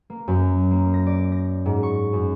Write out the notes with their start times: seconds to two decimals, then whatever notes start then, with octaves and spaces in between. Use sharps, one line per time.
0.10 A#3
0.28 F#2
0.71 A#3
0.94 A#6
1.07 D5
1.32 A#6
1.66 G#2
1.83 C#6
2.13 F#2